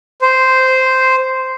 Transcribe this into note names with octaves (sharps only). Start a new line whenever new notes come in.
C5